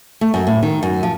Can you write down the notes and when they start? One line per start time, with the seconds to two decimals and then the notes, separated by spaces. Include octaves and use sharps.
0.21 A3
0.34 F#2
0.47 A2
0.63 D#3
0.83 F#2
1.03 F3